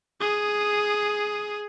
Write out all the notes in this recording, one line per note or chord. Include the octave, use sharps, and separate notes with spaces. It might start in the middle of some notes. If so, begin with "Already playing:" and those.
G#4 D#6